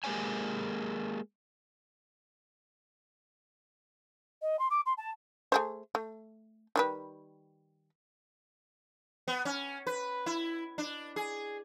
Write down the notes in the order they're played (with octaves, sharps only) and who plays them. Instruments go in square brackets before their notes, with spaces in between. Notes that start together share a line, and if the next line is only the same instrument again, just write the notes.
[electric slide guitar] G#3 A#3 G4 C5 C#5 G#5
[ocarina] D#5
C6
D6
C6
A5
[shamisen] A3 G#4 C5
A3
D#3 G3 B4
[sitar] B3
C#4
B4
E4
D4
G#4